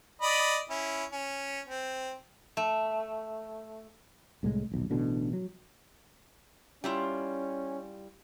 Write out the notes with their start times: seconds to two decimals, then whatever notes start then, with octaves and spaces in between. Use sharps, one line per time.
0.22 D5 D#5 B5
0.70 C#4 E4
1.12 C#4
1.67 C4
2.57 A3
4.43 C2 A2 F3 G#3
4.71 D#1 B1
4.90 A1 B2 D3
5.33 F#3
6.84 G3 C#4 E4 F4